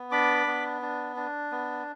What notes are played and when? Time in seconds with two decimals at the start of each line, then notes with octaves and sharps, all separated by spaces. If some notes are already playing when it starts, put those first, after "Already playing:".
Already playing: B3
0.11 D4 B5 D6
0.47 B3
0.82 D4
1.16 D4
1.52 B3